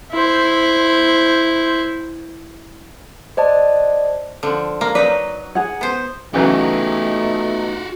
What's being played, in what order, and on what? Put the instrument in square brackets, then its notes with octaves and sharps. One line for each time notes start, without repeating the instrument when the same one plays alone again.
[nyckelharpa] E4 C5
[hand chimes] C5 D5 D#5 A5
[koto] D3 F3
A#3
[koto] F#3 D#4 B4 [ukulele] D5
[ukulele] G#4 F#5
[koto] B3 C5
[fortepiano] C#3 E3 F#3 [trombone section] A3 B3 D#4 [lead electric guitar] F#4 G4